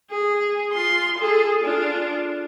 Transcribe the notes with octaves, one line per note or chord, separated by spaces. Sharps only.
G#4
F4 C6
G#4 A4
D4 F4